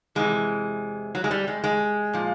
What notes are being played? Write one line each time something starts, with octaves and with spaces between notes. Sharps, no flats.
E2 C3 E3 G#3
F#3
G#3
G3
G#3
G#3
A#2 F3